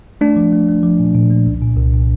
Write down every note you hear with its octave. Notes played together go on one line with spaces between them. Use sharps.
A3 D4
F3
A3
A3
F3
A#2
A#2
A#3
C2
A#2
C2
A#2